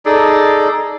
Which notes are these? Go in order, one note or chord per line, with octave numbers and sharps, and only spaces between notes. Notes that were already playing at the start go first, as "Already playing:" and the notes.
D#4 G#4 A4 D5